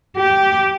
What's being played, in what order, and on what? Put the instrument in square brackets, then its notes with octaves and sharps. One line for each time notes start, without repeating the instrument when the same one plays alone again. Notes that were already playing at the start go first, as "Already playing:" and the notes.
[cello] G4